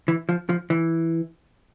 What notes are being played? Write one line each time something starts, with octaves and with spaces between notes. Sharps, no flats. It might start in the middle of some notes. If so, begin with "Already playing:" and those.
E3
F3
F3
E3